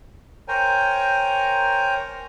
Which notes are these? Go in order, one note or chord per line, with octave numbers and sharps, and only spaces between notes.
A#4 C5 C#5 G5 G#5 A#5